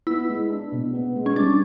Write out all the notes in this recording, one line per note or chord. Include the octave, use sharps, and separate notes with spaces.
B3 E4
G#3
D4
B2
B3
G#3
C#4
G3 D4